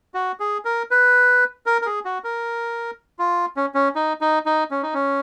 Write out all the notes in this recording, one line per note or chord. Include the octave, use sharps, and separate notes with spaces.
F#4
G#4
A#4
B4
A#4
A#4
G#4
F#4
A#4
F4
C#4
C#4
D#4
D#4
D#4
C#4
D#4
C#4